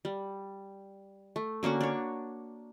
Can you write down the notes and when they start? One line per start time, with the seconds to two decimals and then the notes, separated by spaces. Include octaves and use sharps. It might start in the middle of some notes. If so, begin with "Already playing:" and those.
0.05 G3
1.36 A3
1.63 D3 A#3 C#4 F#4
1.81 D4 C#5